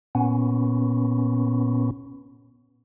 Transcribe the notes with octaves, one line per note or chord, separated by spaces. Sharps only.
A#2 B3 C#4